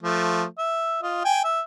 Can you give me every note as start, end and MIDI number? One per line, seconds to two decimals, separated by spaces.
0.03 0.44 53
0.03 0.44 57
0.59 1.00 76
1.03 1.21 65
1.03 1.21 75
1.25 1.41 79
1.25 1.41 80
1.44 1.61 76